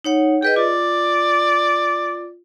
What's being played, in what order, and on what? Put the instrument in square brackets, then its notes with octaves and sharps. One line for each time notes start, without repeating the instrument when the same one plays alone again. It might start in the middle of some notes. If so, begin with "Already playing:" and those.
[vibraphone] D#4 C#5 F#5
[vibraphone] G#4 B4 D#5 [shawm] G5
[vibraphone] F4 [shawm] D5